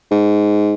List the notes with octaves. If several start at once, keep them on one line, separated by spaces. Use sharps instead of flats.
G#2